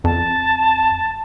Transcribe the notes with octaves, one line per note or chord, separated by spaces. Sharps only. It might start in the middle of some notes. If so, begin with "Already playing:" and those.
F2 A5